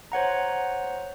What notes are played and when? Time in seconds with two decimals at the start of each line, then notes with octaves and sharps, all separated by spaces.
0.12 C5 C#5 F#5 A#5